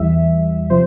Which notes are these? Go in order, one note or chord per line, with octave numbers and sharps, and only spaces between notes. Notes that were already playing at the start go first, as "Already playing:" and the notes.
Already playing: E2 E3 G3 E5
C3 F3 C5